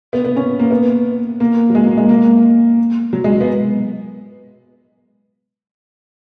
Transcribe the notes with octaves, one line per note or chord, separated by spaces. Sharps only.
B3
B3
C#4
A#3
B3
A#3
F#3
G#3
A#3
G#3
A#3
F#3
G#3
B3